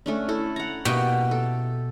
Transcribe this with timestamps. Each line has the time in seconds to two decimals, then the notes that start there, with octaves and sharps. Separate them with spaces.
0.06 A3 C#4 D4
0.29 E4 A4
0.56 F#5 A#5
0.85 B2 A#3 G4 E5
1.31 A4